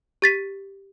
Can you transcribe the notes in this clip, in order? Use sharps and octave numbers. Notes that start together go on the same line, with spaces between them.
G4 A6 B6 D#7